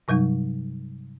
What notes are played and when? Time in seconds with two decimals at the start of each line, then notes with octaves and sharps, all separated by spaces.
0.08 G2 C3 F#3 G3 D#4